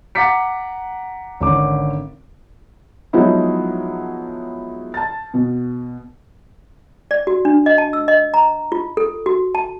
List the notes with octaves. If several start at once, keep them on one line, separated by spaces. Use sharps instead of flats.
F#5 A#5 D6 A6 B6 C#7
G#1 D3 C#4 D6
F3 F#3 G#3 B3 D#4 E4
A5 A6
B2
D5
F#4
D4
D#5
A5
E6
D#5
A#5
F4
A4
F#4
A5